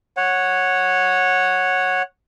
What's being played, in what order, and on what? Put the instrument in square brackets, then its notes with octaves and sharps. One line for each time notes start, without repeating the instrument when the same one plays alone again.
[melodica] C#5 F#5